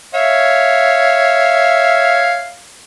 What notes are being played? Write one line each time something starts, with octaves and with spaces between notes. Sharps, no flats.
C#5 E5 F5